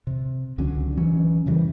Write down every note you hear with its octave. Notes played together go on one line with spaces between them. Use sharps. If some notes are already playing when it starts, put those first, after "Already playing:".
C3
C#2 D3 F#3 C#4
E3 F#3 C#4
F#2 C#3 E3 G3